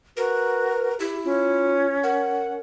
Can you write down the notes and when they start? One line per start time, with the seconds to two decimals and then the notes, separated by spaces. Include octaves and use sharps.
0.17 F#4 A#4 B4
1.00 E4 G4
1.24 C#4 F4
2.03 A#4 F#5